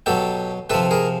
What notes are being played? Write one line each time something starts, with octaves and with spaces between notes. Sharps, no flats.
B2 F#3 G4 A4
C3 F3 A4 B4
G#4 A#4